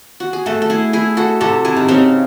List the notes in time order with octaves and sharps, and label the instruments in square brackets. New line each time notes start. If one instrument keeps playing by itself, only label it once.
[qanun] F#4
G#4
[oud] A3 [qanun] F#4 A4
[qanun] A4
E4 G#4
E4 G#4
F#4 A4
[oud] C3 [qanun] F#4 A4
[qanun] E4 G#4
[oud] D#3
[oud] C#3 [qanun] C4 D#4